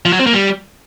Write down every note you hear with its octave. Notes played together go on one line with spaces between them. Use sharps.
F3
F#3
C4
A#3
G3